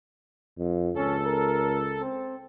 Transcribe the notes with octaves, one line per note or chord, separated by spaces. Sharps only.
F2
C#2 C#4 A4
A#4
C4